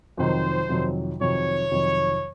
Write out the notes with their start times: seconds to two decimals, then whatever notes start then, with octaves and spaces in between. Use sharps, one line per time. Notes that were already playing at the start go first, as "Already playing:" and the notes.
0.17 F2 C3 D#3 F#3 C5
0.69 F2 C3 D#3 F#3
1.20 F2 C3 D#3 F#3 C#5
1.71 F2 C3 D#3 F#3